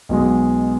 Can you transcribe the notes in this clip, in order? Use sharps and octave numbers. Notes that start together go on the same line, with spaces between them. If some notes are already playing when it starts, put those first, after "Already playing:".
B1 B2 G#3